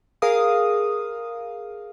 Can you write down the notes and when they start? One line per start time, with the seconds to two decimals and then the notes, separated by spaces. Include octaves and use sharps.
0.22 G#4 A#4 F5 D#6